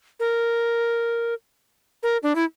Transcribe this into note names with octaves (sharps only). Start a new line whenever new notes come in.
A#4
A#4
D4
E4